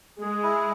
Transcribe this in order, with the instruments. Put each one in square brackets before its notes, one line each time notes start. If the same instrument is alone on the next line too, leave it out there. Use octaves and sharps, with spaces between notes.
[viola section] G#3 [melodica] G#4
[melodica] E4